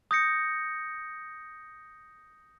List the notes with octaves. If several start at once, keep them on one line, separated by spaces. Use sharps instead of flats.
D#6 G6 A#6 C#7